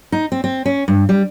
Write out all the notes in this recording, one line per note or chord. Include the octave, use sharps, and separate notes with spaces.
D#4
C4
C4
C#4
G2
G3